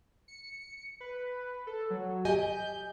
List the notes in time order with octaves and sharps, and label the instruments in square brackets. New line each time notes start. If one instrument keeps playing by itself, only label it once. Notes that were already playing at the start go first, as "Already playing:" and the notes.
[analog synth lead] C#7
B4
A4
F#3
[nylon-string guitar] G4 D#5 G#5 [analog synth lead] G6